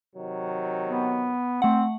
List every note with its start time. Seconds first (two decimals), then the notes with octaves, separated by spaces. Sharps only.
0.15 C3 D#3 F#3
0.85 B3
1.62 A3 C4 F#5